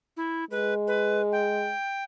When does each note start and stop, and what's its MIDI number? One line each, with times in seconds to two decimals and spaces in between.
0.17 0.44 64
0.51 1.73 56
0.51 0.74 71
0.87 1.22 71
1.32 2.04 79